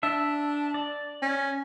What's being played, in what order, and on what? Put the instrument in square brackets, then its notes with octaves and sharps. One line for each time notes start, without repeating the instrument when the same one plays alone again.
[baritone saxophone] D4 [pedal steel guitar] E5
[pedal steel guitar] D5
[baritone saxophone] C#4